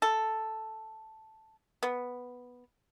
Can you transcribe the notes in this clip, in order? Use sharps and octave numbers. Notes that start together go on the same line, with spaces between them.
A4
B3